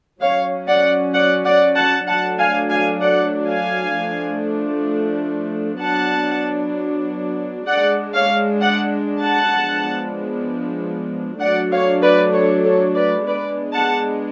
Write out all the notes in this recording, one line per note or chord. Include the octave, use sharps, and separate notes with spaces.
F#3 C#4 C#5 F5
D5 F#5
D5 F#5
D5 F#5
F#5 A5
F#3 A3 D4 F#5 A5
F5 G#5
F5 G#5
D5 F#5
F5 G#5
F3 A3 D4
F#3 B3 D4 F#5 A5
G#3 D4 D5 F#5
C#5 F5
D5 F#5
F#5 A5
F3 G#3 B3 D4
F#3 A3 D4 D5 F#5
C#5 F5
B4 D5
A4 C#5
A4 C#5
B4 D5
G#3 B3 D4 B4 D5
F#5 A5